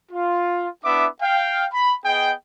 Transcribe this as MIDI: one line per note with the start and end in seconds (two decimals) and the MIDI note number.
0.12 0.67 65
0.85 1.07 59
0.85 1.07 62
0.85 1.07 64
0.85 1.07 71
0.85 1.07 76
0.85 1.07 86
1.22 1.66 77
1.22 1.66 79
1.73 1.95 83
2.06 2.32 59
2.06 2.32 68
2.06 2.32 75
2.06 2.32 79